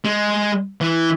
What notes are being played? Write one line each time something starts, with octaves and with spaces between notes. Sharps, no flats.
G#3
E3